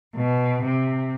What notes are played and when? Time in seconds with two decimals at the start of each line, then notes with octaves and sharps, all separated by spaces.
0.16 B2
0.63 C3